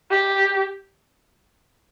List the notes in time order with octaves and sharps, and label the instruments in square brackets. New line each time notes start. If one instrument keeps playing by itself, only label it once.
[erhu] G4